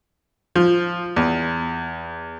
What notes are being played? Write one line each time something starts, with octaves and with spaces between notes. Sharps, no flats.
F3
E2